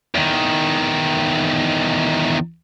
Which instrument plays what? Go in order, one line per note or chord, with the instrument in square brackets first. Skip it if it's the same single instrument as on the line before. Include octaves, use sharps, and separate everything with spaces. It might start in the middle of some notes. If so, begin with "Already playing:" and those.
[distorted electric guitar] E2 D#3